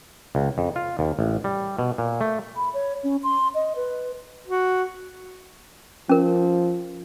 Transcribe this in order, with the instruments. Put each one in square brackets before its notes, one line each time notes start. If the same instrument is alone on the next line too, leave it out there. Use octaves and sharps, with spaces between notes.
[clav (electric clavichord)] C#2
F2
F4
D#2
A1
G3
B2
A#2
A3
[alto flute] B5
C#5
C#4
C6
D#5
B4
[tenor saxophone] F#4
[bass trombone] F3 [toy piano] C#4 A#4